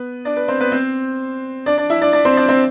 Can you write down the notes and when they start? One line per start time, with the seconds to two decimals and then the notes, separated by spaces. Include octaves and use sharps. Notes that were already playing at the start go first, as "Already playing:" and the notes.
Already playing: B3 B4
0.25 D4 D5
0.37 B4
0.48 C4 C5
0.60 B3 B4
0.72 C4 C5
1.66 D4 D5
1.77 D4 D5
1.90 E4 E5
2.02 D4 D5
2.13 D4 D5
2.25 C4 C5
2.37 D4 D5
2.49 C4 C5